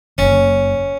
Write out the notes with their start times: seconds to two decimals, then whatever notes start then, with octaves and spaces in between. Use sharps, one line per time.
0.18 F#1 C#4